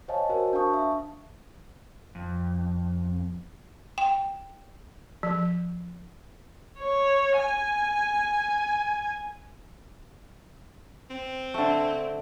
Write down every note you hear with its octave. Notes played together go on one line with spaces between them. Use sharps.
C5 C#5 D#5 F5 G#5 A5
F#4 A#4 C5
D4 F5 A5 C#6 D#6
E5
F2
G5
F3
C#5
G#5
C4
D3 A3